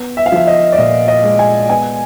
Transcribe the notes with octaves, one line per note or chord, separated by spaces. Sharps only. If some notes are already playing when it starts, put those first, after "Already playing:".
Already playing: B3
E5
F5
F3 E5
D#5
D5
A#2 D#5
D#5
G#3
G#5
B3 G#5